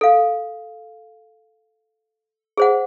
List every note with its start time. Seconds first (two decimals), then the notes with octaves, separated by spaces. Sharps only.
0.01 A4 F5
2.57 G#4 C5 F#5